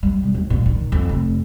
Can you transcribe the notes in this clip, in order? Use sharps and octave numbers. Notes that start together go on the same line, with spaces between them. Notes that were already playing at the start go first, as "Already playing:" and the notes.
G3
B2
D#2
A#2
D#3
F2
F1